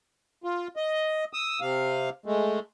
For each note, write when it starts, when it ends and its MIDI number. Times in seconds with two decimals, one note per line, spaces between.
0.44 0.68 65
0.76 1.25 75
1.33 1.60 87
1.33 1.60 88
1.60 2.10 48
1.60 2.10 77
2.26 2.59 56
2.26 2.59 57